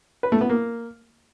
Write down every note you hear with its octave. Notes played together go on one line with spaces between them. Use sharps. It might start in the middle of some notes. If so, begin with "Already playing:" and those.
B4
A3
B3
A#3